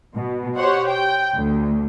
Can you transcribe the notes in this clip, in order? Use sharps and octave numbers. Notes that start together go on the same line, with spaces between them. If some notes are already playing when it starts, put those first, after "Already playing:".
B2
G4 C5 C#5 F#5
G5
D2